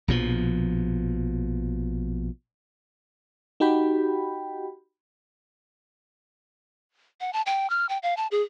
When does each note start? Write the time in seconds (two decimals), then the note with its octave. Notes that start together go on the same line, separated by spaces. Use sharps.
0.08 A#1 B2 F3
3.60 D#4 F#4 G4 G5 B5
7.21 F#5
7.33 A5
7.46 G5
7.70 F6
7.89 G5
8.03 F5
8.17 A5
8.31 G#4